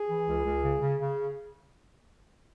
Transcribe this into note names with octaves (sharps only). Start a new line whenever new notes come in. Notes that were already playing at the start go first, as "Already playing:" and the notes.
Already playing: G#4
E3
C#2
C#2
C#3
C#3
C#3